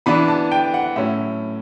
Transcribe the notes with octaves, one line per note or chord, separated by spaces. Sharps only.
E3 B3 D4 B5
A5
G5
F#5
A2 F#3 C#4 E5